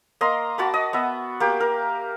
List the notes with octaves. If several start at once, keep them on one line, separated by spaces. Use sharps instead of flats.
A#3 D#5 A#5 C6
F#4 A5 B5 D6
D#5
B3 E5
A#3 G4
A#4